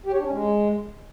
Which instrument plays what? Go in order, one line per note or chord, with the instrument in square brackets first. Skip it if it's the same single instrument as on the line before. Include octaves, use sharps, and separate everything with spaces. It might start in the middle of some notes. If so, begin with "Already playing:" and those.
[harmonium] G4
C#5
D4
C#4
G#3